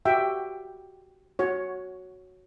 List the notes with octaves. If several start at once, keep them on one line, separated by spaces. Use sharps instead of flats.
F#4 G4 E5 G5
F#4 C#5